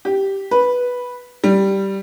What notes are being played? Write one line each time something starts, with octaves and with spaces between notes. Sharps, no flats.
G4
B4
G3